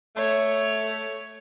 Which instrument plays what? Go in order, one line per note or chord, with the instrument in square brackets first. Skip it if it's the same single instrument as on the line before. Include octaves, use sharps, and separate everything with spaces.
[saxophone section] A3 [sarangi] C#5